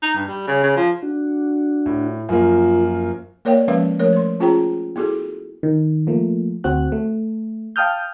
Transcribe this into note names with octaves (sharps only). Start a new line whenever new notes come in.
D#4
G2
G3
C#3
C#3
F3
D4 F#4
A2
F#2 F3 A#3 F4
A#3 A#4 C#5 D5 F5 G5
F3 G#3 C#4 B4 E5 F5
F3 A3 A#4 C#5
C5 C6
C#4 F4 G#4 C5 G5 A#5
B3 E4 F#4 G#4 A4
D#3
F3 A3 A#3
D2 C4 F#4 F#6
A3
F5 G5 A5 D#6 F6 G6